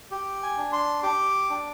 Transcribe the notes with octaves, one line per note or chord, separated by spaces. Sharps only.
G4
G#5
D4
C6
G4 D6
D4